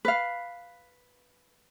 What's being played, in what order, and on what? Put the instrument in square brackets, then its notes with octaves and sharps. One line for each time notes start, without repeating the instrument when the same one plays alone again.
[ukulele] B4 F5